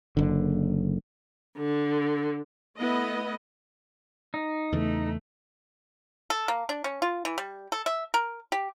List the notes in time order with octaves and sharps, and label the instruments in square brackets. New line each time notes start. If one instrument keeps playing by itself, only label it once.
[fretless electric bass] F#1 D3
[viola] D3
[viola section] A3 B3 E4 D#5
[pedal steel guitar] D#4
[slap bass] E2 C#3 E3 [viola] A3
[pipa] A4
A#3
D4
C#4
F4
E3
G3
A4
E5
A#4
G4